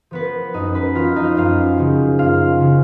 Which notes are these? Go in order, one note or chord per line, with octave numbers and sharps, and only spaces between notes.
F3 B3 B4
F#2 D#4 D#5
B4 B5
F3 F4 F5
D#4 D#5
F#2 F4 F5
C#3 F3
F#2 F4 F5
C#3 F3